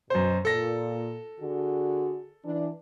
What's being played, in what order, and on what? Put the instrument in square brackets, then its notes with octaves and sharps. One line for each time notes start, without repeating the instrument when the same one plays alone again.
[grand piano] F#2 C5 [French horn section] B2
[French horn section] A#2 [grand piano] A4 A#6
[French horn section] D3 F#4 G#4
E3 D4